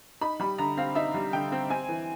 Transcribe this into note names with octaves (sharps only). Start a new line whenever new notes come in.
D#4 B5
G3 B5
D3 A#5
C4 F5
D#4 E5
G3
D3 G5
C4
C4 G#5
E3